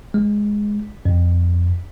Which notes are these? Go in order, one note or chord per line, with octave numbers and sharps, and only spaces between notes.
G#3
F2